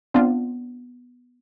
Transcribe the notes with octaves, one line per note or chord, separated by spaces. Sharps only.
B3 C4 D4 F4